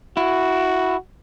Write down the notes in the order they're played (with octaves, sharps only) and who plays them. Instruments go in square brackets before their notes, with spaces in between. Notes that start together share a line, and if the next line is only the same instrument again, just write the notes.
[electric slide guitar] E4 [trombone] F#4